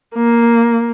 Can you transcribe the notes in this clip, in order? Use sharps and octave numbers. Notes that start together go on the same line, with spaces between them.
A#3